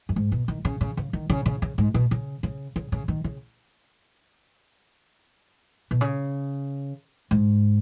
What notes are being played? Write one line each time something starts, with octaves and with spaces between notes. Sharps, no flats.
F#2
G#2
B2
D#3
C#3
C#3
C#3
D#3
C#3
C#3
C#3
G#2
B2
C#3
C#3
C#3
C#3
D#3
C#3
B2
C#3
G#2